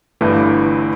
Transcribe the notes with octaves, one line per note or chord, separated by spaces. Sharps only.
G1 G2 E3 A3